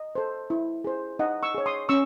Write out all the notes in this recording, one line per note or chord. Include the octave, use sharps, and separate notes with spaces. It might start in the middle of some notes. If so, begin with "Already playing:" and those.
Already playing: D#5
A4 C5
E4
G#4 C5
D#4 D#5 F#5
C#6 E6
G#4 C#5
C6 D#6
C#4 C#6 E6